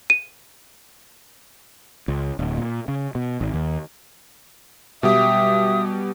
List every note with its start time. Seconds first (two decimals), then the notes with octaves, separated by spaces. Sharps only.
0.10 D#7
2.08 C#2
2.39 D1
2.58 A#2
2.88 C#3
3.15 B2
3.41 G#1
3.54 D#2
5.03 B2 G3 G4 E5 D#6